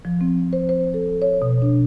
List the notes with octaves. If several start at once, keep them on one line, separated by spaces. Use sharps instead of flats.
F3
C4
C5
C5
A4
C#5
B2
D4